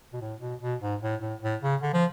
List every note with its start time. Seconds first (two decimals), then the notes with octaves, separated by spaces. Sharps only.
0.13 B2
0.21 A2
0.41 B2
0.61 B2
0.81 G#2
1.02 A2
1.21 A2
1.42 A2
1.62 C#3
1.82 D3
1.93 F3